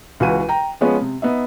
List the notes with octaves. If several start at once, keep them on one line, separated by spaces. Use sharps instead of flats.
C#2 E3 F#4 B4 D#7
G5 A#5
F3 G#3 B3 C#4
C3
B3 D#4 E5